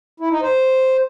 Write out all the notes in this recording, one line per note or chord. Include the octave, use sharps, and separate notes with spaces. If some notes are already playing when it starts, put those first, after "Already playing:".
E4
D#4
C5